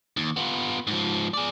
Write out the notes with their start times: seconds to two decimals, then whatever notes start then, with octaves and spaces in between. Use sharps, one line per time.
0.17 D#2
0.37 B3 F4
0.87 G#2 F3
1.34 G#4 D5